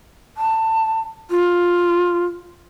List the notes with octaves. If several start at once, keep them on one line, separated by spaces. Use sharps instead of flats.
A5
F4